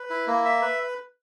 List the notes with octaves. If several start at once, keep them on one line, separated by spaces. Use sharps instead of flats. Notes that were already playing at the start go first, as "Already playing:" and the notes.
Already playing: B4
E4
A#3
E5
B4